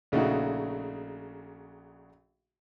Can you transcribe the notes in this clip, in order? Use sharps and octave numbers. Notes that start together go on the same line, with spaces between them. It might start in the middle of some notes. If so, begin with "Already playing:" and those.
A#1 C#3 A3 D#4 F#4